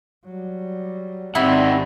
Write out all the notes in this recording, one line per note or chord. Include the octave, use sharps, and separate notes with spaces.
F#3 G3
G#1 D#3 C4 D4 E4 G4 D#5 F#5